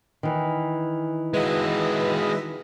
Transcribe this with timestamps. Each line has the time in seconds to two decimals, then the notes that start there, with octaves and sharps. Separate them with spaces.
0.23 D#3 E3
1.34 G#3 F#4 B4 D#5 E5